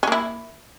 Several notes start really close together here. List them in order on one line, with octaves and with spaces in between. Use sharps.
C#4 A#3 E4